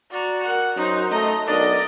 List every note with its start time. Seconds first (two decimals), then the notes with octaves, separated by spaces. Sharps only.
0.11 F#4 D5 A#5
0.43 A#4 F#5
0.77 F#2 D#4 F#4 C5
1.11 A3 D#5 A#5
1.48 B1 D4 A#4 D5 D#5